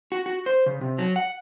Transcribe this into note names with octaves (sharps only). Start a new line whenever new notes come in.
F#4
F#4
C5
C#3
C3
F#3
F#5